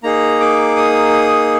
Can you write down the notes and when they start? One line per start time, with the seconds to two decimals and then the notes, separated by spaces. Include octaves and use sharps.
0.03 A#3 D#4 G#4 A#5
0.41 D6
0.77 D#6